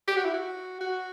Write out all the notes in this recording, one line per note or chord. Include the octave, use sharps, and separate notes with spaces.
G4
F#4
E4
F#4
F#4